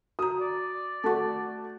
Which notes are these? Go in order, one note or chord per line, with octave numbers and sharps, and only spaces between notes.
F#4 A#5 D#6
D5
A3 F#4 A5 C#6